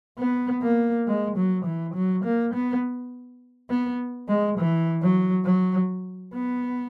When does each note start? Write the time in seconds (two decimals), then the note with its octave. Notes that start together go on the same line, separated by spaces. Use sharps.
0.19 B3
0.63 A#3
1.07 G#3
1.37 F#3
1.66 E3
1.95 F#3
2.25 A#3
2.54 B3
3.70 B3
4.29 G#3
4.59 E3
5.02 F#3
5.46 F#3
6.34 B3